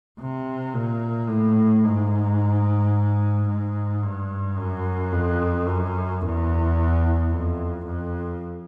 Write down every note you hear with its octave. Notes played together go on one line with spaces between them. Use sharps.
C3
A#2
A2
G#2
G#2
G2
F#2
F2
F#2
E2
F2
F2